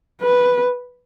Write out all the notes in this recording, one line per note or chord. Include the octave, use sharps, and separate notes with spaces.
B4